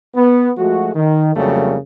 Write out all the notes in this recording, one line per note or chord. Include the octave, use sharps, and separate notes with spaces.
B3
F3 G#3 A3 F#4
D#3
F2 C#3 F#3 G3 A3 A#3